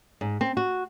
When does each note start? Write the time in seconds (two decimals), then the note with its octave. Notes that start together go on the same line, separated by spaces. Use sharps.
0.21 G#2
0.41 C4
0.57 F#4